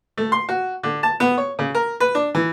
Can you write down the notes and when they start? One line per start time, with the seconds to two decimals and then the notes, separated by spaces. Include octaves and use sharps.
0.17 A3
0.32 C6
0.49 F#4
0.83 D3
1.03 A5
1.20 B3
1.38 C#5
1.59 C#3
1.75 A#4
2.00 B4
2.15 D4
2.35 E3